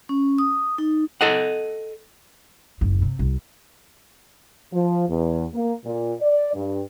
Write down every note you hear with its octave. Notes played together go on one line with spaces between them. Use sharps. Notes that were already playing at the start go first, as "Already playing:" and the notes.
C#4
D#6
D#4
A4 D#5 F#5
F#1 G#2
C3
C2
F3
E2
A#3
A#2
D5
G2